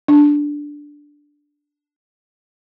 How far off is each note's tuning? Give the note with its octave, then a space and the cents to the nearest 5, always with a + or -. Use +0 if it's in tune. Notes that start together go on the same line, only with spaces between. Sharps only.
D4 -5